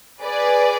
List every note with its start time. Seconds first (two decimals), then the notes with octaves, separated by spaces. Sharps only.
0.22 G#4 B4 D5